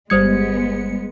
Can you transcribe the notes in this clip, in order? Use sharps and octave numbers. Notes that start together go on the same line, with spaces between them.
G1 G3 G#3 B3 C5 D#6 G#6 C#7